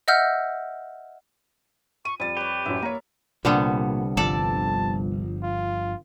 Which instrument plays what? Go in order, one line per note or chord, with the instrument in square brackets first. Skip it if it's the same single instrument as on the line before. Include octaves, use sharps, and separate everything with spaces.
[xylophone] D#5 E5 F#5 E6 F6 G6
[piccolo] C#6 [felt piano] D#7
[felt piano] F2 A6 [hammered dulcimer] G3 [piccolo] D#7
[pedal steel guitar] G4 [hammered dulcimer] B4 C#5
[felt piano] A1 F#2 [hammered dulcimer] E5
[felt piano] A#3 C#5 [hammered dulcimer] A#5
[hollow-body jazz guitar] C2 [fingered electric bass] A#2 [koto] D3 G3 B3
[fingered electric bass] G1 F3 [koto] A4 D5 [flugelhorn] A5
[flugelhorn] F4